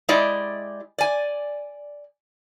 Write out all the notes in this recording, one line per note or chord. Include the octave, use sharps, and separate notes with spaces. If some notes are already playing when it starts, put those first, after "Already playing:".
G#3 E4 G4 D5 D#5
D5 G#5